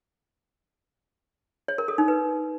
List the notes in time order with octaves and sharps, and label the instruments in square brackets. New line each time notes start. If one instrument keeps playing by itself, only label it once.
[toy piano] C#5
A#4
A4
D#4
B4